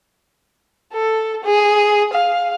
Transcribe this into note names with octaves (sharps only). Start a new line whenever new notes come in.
A4
G#4
F5